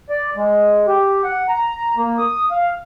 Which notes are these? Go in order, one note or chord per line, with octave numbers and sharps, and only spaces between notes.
D5
G#3
G4
F#5
A#5
A#3
D#6
F5